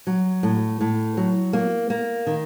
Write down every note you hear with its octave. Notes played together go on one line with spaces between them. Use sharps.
F#3
A2
A2
F#3
A#3
A#3
D#3